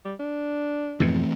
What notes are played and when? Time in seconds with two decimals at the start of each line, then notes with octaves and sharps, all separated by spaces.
0.05 G3
0.20 D4
1.00 F2 G#2 B2 E3 A3 C4